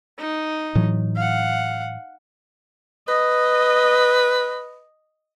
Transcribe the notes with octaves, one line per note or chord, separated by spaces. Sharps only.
D#4
A2 E3 F#3
F5 F#5
B4 D#5